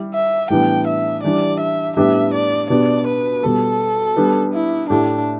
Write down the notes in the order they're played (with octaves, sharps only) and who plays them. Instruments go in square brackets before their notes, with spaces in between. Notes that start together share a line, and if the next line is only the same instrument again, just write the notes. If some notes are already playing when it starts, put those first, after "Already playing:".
Already playing: [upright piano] G3 E4 G4
[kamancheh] E5
[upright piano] A2 E3 G3 B3 D4 [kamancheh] G5
[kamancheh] E5
[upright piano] E3 G3 D4 G4 [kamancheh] D5
[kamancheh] E5
[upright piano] A2 G3 B3 D4 G4 [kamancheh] E5
[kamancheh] D5
[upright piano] B2 B3 D4 G4 [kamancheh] D5
[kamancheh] B4
[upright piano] B2 G3 B3 [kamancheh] A4
[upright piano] G3 B3 D4
[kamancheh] E4
[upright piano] A2 A3 E4 G4 [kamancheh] D4